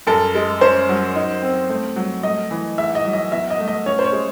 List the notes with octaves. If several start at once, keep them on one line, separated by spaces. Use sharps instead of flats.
F#2 A4
G#3
C#4 C5
F#3
D#4
C4
A3
F#3
A3 D#5
E3
G#2 E5
D#5
F#3
D#5
E2 E5
D#5
A3
D#5
C#4 C#5
C5
C#5
G#3